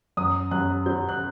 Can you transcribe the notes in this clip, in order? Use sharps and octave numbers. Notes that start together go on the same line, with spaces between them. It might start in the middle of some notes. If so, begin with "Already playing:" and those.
F#2 D#6
F#2 F#6
F#3 G6
F#6